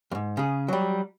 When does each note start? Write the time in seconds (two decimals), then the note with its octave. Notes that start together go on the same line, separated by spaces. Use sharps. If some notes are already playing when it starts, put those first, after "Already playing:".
0.11 F2 G#2
0.37 C#3 G#4
0.68 F#3 G3